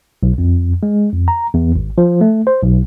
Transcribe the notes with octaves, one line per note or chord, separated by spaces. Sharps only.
B1
F2
G#3
F2
A#5
E2
G#1
F3
A3
C5
B1